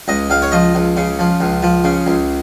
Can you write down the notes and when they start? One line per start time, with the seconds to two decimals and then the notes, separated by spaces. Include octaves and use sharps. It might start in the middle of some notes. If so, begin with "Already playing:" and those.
0.08 C#2 D#5
0.30 C#2 F5
0.42 C#5
0.52 F3 D#5
0.75 C#2
0.97 C#3
1.19 F3
1.40 C#2
1.63 F3
1.84 C#3
2.07 C#2